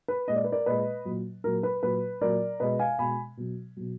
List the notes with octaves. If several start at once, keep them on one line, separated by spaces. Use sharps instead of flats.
B4
A#2 G#3 D#5
D5
B4
A#4 D5
A#2 G#3 B4 D#5
A#2 F#3
A#2 F#3 A#4
B4
A#2 F#3 B4
A#2 F#3 A#4 D5
B2 G#3 B4 D#5
F5 G#5
B2 G#3 G#5 B5
B2 F#3
B2 F#3